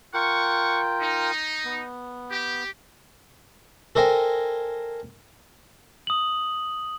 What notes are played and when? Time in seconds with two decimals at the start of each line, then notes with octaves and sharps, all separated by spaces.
0.14 F4 A#4 F#5 G5 C#6
1.01 D#4
1.65 B3
2.32 G4
3.95 A4 A#4 C5 D#5 G5 G#5
6.07 D#6 F#7